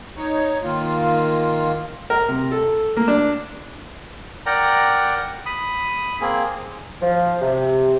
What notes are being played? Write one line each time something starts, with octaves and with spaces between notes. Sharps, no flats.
D#4 C#5
D#3 A#3 F4
A#4
C3
A4
A#3
D4
A#4 D5 F#5 G5 A#5
B5 D#6
A#3 C4 G#4
F3
C3